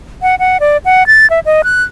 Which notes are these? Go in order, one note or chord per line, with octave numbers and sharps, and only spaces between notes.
F#5
F#5
D5
F#5
A6
E5
D#5
F#6